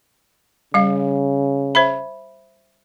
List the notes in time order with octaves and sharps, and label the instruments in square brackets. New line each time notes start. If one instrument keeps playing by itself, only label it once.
[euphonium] C#3 [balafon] G3 F5
[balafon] C5 E5 B5